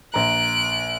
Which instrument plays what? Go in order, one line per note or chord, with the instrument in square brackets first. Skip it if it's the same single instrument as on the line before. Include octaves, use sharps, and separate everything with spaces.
[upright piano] A#1 A#5 [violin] F#6 D7